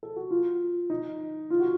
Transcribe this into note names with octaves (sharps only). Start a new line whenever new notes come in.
A4
F#4
F4
D#4
F4
F#4